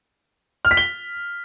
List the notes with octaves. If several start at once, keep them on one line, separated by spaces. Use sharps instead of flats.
F6
B6
G7